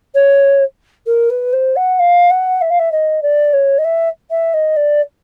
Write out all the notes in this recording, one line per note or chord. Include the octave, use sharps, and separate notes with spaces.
C#5
A#4
B4
C5
F#5
F5
F#5
E5
F5
E5
D#5
D5
C#5
D#5
E5
E5
D#5
D5